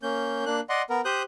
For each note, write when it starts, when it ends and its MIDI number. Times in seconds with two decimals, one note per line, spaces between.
0.03 0.45 58
0.03 0.45 61
0.03 0.45 91
0.46 0.60 58
0.46 0.60 62
0.46 0.60 90
0.69 0.82 74
0.69 0.82 75
0.69 0.82 78
0.69 0.82 84
0.90 1.01 59
0.90 1.01 70
1.05 1.23 67
1.05 1.23 72
1.05 1.23 87
1.05 1.23 90
1.05 1.23 91